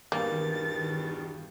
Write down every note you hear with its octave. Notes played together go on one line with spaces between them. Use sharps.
E2 G2 B2 D#3 A#3 A6